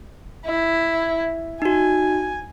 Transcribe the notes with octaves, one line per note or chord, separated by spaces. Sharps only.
E4
D#4 F#4 G#5